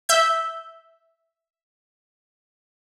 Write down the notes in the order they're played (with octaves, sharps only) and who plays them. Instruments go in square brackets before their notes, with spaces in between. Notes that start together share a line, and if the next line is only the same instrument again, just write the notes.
[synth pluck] E5 G6